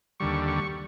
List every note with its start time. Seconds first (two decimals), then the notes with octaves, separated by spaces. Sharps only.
0.20 D#2 D3 G3 C#6
0.48 C#6